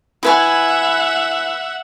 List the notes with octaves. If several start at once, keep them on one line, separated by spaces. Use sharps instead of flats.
E4 B4 E5 F#5 G#5